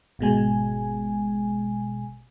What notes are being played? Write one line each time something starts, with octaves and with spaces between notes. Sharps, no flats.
G#1 B2 G#3 G#5